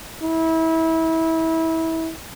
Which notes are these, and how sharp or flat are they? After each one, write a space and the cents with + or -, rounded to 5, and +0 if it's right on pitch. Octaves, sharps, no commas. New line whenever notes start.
E4 -25